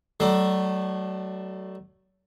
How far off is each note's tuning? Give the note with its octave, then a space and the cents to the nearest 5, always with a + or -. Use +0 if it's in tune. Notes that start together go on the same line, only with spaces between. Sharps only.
F#3 +35 A3 +0 D4 +30